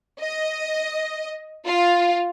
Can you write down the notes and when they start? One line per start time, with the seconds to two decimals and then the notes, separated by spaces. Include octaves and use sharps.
0.20 D#5
1.65 F4